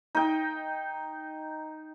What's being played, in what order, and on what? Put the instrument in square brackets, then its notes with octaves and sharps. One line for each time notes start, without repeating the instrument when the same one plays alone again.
[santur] D#4 G5